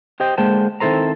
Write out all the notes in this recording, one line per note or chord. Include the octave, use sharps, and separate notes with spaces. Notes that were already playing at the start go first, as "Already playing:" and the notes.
G4 C5 D#5 G5
D3 G#3 A#3 C5 G5 A5
D#3 C4 E4 A4 C5 A#5